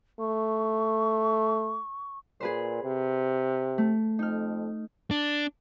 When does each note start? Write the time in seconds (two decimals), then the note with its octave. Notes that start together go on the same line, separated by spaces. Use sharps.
0.20 A3 C#6
2.40 A#2 G#4 B4 C5
2.83 C3
3.78 A3
4.19 F2 D#4 F6
5.11 D4